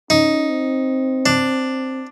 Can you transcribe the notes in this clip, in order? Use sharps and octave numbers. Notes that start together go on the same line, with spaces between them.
C#4 D#4
C4
D4